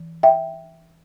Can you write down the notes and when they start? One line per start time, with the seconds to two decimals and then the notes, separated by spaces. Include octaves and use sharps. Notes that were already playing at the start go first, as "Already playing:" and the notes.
Already playing: E3
0.23 E5 G5